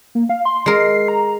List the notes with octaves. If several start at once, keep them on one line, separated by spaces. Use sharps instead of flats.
A#3
F5
C6
G#3 A#4 C7
A#5